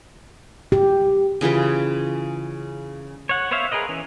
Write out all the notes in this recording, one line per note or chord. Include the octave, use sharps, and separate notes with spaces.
G4
C#3 E3 F4 B4
C#5 F#5
B3 C5 C#5 E5 F5
G#4 A#4 B4 D#5
E3 C#4